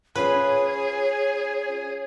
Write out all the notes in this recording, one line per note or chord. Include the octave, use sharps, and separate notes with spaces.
C#4 F4 G#4 B4 C#5